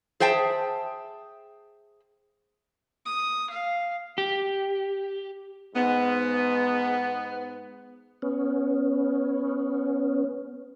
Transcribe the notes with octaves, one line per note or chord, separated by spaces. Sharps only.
G#4 C5 E5 G5 A5
D#6
F5
G4
G#2 B3
B3 C#4